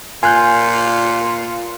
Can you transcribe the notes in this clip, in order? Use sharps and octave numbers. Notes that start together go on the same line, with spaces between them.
A#2 F4 G#5 F#6 G6